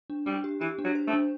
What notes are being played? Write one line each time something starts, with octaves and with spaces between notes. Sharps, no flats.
D4
G3 D4
G4
E3 G4
D4
F#3
C5
A3
D4